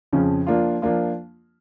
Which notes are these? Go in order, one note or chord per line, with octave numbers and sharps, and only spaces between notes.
F2 C#3 F3 C#4
F3 A#3 D4 F4
F3 A#3 D4 F4